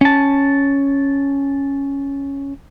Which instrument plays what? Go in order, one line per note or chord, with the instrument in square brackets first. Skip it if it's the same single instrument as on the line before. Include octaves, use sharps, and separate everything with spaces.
[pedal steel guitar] C#4 A5